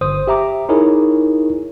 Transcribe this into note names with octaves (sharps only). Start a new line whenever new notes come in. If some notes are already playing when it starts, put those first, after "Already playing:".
G1 C5 D#6
G4 E5 A#5 D6
D#4 E4 G#4 A#4 C#5